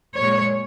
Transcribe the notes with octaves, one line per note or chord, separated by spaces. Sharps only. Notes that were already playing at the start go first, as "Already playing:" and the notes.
A#2 G#3 C#5